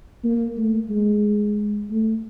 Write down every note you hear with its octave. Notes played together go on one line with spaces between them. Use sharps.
A#3
A3
G#3
A3